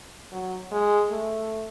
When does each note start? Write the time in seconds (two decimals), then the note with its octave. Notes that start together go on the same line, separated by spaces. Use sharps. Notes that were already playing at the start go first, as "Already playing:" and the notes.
0.32 F#3
0.72 G#3
1.10 A3